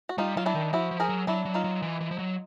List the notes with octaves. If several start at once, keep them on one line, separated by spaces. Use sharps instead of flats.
F#4
G3 D#4 F4
F#3 F4
D4 E4
D#3
F3 E4 F#4
F3
G#4 A#4
F#3
F#3 D4 E4
F#3
D#4 F4
F#3
E3
E3
F3
F#3